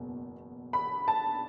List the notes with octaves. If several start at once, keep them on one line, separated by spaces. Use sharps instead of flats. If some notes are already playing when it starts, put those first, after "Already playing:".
Already playing: F#1 E2 B2
B5
A5